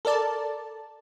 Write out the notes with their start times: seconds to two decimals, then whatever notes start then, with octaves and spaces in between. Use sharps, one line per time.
0.05 A4 A#4 D5 A5